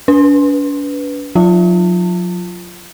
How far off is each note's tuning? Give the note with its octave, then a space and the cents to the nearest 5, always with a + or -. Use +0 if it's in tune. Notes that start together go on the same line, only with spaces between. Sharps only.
D4 -40 B4 +0
F#3 -45 F4 -15 A5 +35